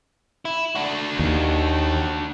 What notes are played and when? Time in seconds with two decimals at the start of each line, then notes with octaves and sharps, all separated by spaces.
0.45 E4
0.75 D4 F#4
1.19 D#2